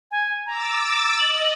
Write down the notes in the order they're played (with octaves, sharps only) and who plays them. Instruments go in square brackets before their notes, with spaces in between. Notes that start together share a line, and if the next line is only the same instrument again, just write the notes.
[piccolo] G#5
[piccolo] A#5 [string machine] D6 E6 A6
[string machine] D#5 [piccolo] F#7